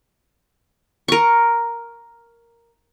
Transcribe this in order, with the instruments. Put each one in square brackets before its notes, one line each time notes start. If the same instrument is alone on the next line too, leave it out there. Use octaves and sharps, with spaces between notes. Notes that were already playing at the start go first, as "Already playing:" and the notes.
[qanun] A#4 C#6